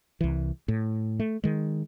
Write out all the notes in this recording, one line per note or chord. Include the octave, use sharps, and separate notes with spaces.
C2 E3
A2
A3
D#3 G#3